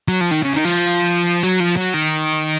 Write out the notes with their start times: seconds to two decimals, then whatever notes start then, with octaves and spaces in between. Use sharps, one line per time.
0.09 F#3
0.21 F3
0.31 D#3
0.43 C#3
0.54 D#3
0.65 F3
1.43 F#3
1.60 F3
1.77 F#3
1.94 D#3